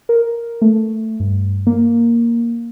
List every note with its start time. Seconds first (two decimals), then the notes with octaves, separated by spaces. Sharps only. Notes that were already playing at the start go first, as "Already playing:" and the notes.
0.09 A#4
0.62 A3
1.20 G2
1.67 A#3